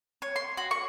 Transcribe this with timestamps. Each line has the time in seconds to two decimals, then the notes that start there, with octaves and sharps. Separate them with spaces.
0.22 C#5
0.36 C6
0.57 F#4
0.71 C#6